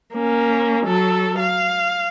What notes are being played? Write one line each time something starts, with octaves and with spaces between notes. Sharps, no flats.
A#3 C#4
F#3 A4
F5